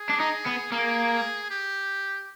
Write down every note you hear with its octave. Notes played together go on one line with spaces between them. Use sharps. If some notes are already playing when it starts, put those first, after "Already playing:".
Already playing: G#4
D4
D#4
B3
A#3 G#4
G4